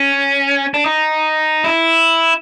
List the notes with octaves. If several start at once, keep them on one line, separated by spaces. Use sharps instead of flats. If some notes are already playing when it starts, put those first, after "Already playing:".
Already playing: C#4
D4
D#4
E4